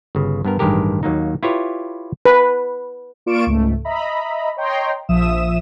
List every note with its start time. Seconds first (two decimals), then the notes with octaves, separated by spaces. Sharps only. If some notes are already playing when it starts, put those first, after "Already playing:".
0.15 G1 C#3
0.45 G2 B3 A#4
0.59 A1 G2 D#3 G#3 G4 A#4
1.03 D#2 F#3 A#3 D#4
1.43 E4 F4 G4 B4 C#5
2.25 B4
3.26 A#3 F4 D5 C#6 D7 E7
3.46 C#2 G#2 A3
3.85 D#5 E5 A#5 B5
4.57 C#5 D#5 G5 A#5 C6
5.09 A#1 F3 E5 D#6 E7